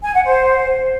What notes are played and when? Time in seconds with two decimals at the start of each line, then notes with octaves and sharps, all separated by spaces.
0.03 G#5
0.14 F#5
0.25 C5